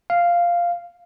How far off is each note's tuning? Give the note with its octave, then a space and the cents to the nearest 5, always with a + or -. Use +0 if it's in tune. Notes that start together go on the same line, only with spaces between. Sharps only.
F5 -5